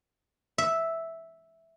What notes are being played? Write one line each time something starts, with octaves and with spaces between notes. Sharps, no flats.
E5